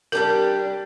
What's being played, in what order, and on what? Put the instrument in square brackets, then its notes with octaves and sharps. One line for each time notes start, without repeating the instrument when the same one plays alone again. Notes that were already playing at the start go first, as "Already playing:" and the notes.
[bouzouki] G3 D4 G4 [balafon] A#4